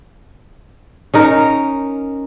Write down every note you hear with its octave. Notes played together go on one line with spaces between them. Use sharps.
C#4 D#4 A#4